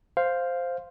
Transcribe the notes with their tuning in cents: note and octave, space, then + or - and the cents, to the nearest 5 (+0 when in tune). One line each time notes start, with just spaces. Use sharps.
C5 +0 F5 +0